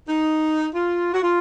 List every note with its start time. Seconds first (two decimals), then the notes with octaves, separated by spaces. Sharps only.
0.08 D#4
0.74 F4
1.13 F#4
1.23 F4